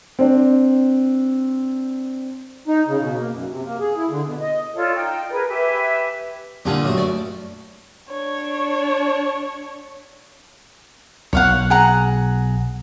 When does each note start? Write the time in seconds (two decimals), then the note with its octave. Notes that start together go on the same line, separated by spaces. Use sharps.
0.19 C4 D4
2.68 D#4
2.88 C#3
3.00 B2
3.19 A#3
3.31 F#2
3.50 C3
3.65 A#3
3.80 G#4
3.96 E4
4.10 D3
4.23 B2
4.41 D#5
4.74 F4 A4 C#5 D5
4.94 D#4 G5
5.31 G#4 A#4 B4
5.48 G4 B4 E5 G#5
6.65 A#2 D3 G3 F4 G4 G#4
6.85 F#2 A3 F#4
6.98 D5
8.11 D4 C#5
11.33 B1 C#5 F5 F#5
11.70 G#4 F#5 A#5